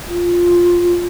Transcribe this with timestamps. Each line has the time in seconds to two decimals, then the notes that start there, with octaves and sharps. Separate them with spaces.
0.08 F4